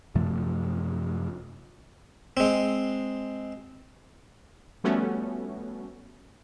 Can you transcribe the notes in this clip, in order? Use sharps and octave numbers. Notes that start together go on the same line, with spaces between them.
F#2 C3 F3 A3
G#3 C4
F3 G3 A3 B3 C#4 F#4